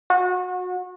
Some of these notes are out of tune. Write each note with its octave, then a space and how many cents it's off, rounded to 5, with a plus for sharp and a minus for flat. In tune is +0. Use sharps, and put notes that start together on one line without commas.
F#4 -30